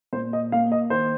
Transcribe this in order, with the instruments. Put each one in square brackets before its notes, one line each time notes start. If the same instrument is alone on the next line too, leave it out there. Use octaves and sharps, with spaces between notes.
[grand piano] A#2 C5
D#5
A#3 F5
D#5
D#3 C5